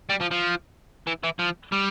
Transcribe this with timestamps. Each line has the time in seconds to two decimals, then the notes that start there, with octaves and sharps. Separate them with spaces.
0.10 G3
0.21 F3
0.31 F3
1.07 E3
1.24 E3
1.39 F3
1.72 G3